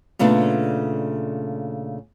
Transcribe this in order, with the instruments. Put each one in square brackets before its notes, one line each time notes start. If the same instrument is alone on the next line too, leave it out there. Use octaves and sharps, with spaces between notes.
[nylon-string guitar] A#2 C#3 A3 B3 D4